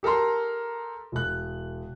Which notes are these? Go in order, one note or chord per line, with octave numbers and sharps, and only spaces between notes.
G4 A4 A#4 A#5 C6
E1 F#6